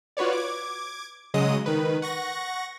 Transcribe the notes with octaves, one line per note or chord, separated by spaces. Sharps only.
F4 F#4 B4 C#5 D5
D6 G#6
C#3 F#3 G#3 D#5 D#6
D#3 B4
F#5 C#6 A#6